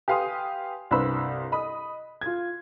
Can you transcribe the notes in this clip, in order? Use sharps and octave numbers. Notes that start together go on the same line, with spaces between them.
G4 B4 F5 G#5 C6 D#6
C2 G2 B4 C5 B5 E6
D#5 B5 D#6
F4 G#6